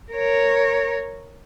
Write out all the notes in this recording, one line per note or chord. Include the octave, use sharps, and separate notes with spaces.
A#4 C#5